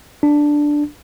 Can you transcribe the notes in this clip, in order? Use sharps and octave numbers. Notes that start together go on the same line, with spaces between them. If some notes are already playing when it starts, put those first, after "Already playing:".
D4